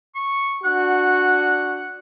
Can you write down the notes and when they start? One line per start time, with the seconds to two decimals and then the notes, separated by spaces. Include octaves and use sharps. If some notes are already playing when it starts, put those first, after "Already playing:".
0.15 C#6
0.64 D4 F#4 F#5